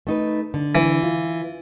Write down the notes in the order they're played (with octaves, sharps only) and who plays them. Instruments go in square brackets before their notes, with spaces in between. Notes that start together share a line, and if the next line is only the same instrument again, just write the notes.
[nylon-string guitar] A3 D#4 B4
D3
[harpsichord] E3
[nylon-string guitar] F4